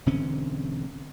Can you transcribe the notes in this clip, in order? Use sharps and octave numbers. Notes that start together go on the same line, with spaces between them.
E1 D3 C4 C#4